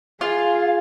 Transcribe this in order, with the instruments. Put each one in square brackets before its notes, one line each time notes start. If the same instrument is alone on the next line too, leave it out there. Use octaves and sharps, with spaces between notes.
[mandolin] F4 [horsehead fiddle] G#4 [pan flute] F5